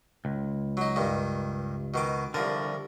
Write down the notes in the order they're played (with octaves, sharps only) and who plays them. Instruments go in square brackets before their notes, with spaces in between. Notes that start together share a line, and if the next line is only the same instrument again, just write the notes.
[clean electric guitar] C#2
[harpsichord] F#3 D#4
G2 D#3
B2 D#3 D6
[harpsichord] C2 F3 A#4 [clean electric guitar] D3